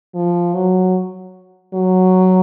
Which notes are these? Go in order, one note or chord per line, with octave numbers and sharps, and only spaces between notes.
F3
F#3
F#3